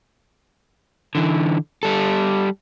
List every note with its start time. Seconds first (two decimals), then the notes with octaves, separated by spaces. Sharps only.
1.15 D3 E3
1.83 G3 A4